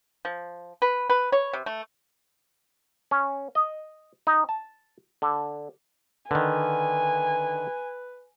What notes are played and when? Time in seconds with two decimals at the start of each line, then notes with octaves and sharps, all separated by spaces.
0.25 F3
0.82 B4
1.10 B4
1.32 C#5
1.53 C3
1.66 A3
3.11 C#4
3.55 D#5
4.27 D#4
4.49 A5
5.22 D3
6.31 D3 D#3 B4 G#5